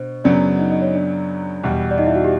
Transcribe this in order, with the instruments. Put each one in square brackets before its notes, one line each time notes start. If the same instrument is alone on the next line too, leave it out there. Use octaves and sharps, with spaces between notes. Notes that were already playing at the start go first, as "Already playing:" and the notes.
Already playing: [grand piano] B2 [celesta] D4 C5
[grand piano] F#2 C#3 F#3 B3 [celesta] D4 D5
[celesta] D#4 D#5
D#4 D#5
C#5
D4 D5
[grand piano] E2 B2 G3
[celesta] D5
D#4 D#5
E4 E5
F#4 F#5
G4